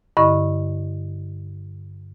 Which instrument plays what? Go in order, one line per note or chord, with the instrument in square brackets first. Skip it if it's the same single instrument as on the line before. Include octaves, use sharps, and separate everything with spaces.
[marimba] G2 D3 E4 D#5 C#6